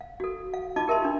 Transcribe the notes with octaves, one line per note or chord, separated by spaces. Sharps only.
F5
F#4 A4
F5
D#4 F4 D#5 A5 D6
G4 A#4 E5 A5 C6
D4 F4